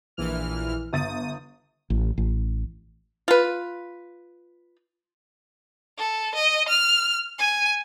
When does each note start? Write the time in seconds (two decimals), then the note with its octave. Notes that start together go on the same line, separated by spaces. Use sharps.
0.17 A#1 E3 F6
0.93 G1 D#6 A6 D#7
1.90 A1
2.18 A1
3.28 F4 B4
5.98 A4
6.35 D#5
6.68 F6
7.39 G#5